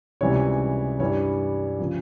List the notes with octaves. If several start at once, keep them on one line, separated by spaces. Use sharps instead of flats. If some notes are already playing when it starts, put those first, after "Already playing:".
C#2 C3 E3 G3 C#4 C#5
G2 E3 G3 C#5
C#3 F3